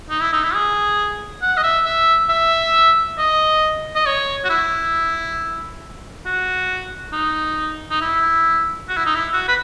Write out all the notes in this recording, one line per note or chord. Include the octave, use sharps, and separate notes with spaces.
D#4
E4
D#4
E4
G#4
F#5
D#5
E5
E5
E5
D#5
D#5
C#5
F#4
E4
F#4
D#4
D#4
E4
F#4
E4
D#4
E4
F#4
B4